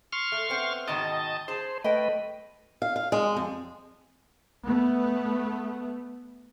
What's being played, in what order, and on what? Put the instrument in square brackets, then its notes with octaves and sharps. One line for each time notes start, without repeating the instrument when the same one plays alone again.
[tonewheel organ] C6 C#6 F6
[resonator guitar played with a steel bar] A3
B3 C4
[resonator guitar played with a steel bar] G#2 B2 D#3 [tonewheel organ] D#5 A5
[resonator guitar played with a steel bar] G#4 A5 [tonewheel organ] C5
[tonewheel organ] A3 B4 [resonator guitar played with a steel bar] D#5 G5
[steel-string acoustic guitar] F5
F5
G#3
F2
[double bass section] A3 B3